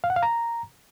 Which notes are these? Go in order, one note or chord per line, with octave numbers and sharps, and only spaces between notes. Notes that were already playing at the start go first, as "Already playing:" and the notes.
F5
F#5
F5
A#5